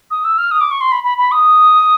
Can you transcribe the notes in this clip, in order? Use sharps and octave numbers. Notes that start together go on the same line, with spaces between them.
D#6
E6
F6
D#6
D6
C#6
C6
B5
B5
B5
D#6